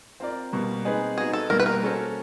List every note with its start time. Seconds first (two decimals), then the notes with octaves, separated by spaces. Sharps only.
0.20 C4 F4 A#4 D5
0.53 B2 G3 A#3
0.85 G#3 C4 D#4 G#4 B4
1.18 B3 D#4 F#4 G#4
1.33 A4
1.50 B2 G3 A#3 A#4
1.60 B4
1.66 A#4
1.82 A#3 C#4 F#4 A4 C5